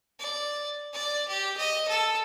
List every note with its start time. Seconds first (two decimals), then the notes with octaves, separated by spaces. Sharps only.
0.19 D5
0.93 D5
1.28 G4
1.57 D#5
1.88 A4